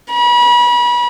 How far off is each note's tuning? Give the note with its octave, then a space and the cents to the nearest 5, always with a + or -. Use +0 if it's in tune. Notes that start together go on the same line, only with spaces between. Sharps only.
B5 -35